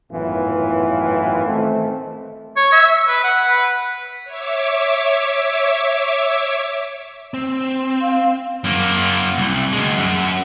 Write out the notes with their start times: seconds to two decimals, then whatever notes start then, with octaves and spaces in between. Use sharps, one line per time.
0.11 G#1 F#2 A2 E3 B3 F4
1.46 D#3 A3 C4
2.57 C#5
2.72 E5
3.08 B4
3.24 F#5
3.49 B4
4.24 C#5 E5 D6
7.34 C4
8.02 F5
8.64 F#2 A#3
9.38 C2
9.73 D2 G#3
9.97 F#2